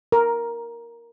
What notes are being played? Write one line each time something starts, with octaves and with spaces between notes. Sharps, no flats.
A#4